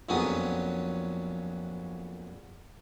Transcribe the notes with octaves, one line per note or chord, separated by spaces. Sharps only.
A#1 F2 F#3 B3 C#4 D#6